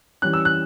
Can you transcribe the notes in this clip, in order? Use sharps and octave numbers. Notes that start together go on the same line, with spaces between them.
E3 G3 C#4 F#6
E6
F#6